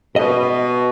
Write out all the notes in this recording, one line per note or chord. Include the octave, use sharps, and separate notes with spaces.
B2 D#5